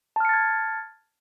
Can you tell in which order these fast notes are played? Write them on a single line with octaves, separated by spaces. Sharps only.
A5 F6 C#7 A6 G#6